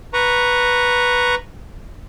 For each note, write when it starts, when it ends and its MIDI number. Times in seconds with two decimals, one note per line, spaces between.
0.13 1.35 71
0.13 1.35 82
0.13 1.35 85